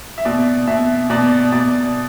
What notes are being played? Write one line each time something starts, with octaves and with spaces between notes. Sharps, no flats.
E5
B2 D5
B2 E5
B2 D5
B2 D5